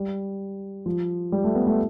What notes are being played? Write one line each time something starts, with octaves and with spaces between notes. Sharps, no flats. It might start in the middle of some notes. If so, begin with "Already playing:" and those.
Already playing: G3
F3
G3
A3
B3
A3